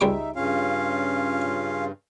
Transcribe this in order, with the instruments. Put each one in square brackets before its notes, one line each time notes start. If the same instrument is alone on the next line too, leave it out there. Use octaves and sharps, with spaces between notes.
[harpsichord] C#2 G3 D6 [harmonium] D#4 E5
[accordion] G2 [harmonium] C#3 F4 [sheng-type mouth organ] C#4 F5